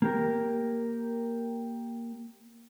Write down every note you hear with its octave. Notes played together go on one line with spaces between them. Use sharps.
A#3 G4 A#4